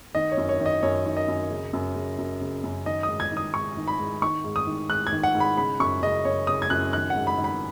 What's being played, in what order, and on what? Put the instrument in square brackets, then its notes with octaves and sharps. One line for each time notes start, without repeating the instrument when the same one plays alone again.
[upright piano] D#3 D#5
C#5
F#2
C#5
D#3
D#5
F#2 C#5
D#3
D#5
F#2
C#3
F#2
C#3
F#2
C#3
F#2
D#3 D#5
D#6
G#2
G#6
D#3
D#6
G#2 C#6
D#3
B5
G#2
D#3 C#6
G#2
D#6
D#3
G#2 F#6
G#6
D#3
F#5
G#2
B5
C#3 B5
F#2 C#6
C#3 D#5
F#2 C#5
C#3 D#6
G#6
F#2 F#6
D#3 F#6
F#5
G#2
B5
D#3
B5